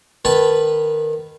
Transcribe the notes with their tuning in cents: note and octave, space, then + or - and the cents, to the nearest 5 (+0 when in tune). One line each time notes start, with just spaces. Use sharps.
D#3 -20 B4 -5 A5 -5